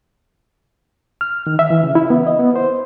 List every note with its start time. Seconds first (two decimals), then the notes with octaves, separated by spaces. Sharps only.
1.21 F6
1.47 D#3
1.59 E5
1.70 E3
1.84 C#3
1.95 E4
2.10 B3
2.27 D#5
2.39 B3
2.56 C5